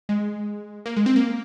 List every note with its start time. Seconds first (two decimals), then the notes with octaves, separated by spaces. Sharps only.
0.09 G#3
0.86 A#3
0.97 G#3
1.06 C4
1.16 A#3